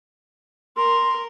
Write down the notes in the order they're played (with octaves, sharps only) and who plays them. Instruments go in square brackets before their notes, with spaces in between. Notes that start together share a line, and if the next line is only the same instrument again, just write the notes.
[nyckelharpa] A#4 [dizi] C6